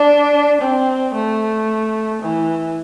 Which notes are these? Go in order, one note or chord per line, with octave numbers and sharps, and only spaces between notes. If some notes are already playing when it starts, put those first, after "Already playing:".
Already playing: D4
C4
A3
E3